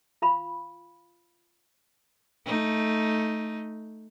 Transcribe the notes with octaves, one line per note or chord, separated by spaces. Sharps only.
F4 F5 B5
A3 D#4